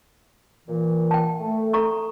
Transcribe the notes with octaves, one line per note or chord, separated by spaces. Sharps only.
A#2 E3
G5 A5
A3
A4 A#5 C#6